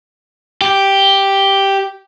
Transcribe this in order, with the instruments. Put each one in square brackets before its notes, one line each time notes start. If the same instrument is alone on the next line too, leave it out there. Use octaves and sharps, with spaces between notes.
[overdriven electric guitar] G4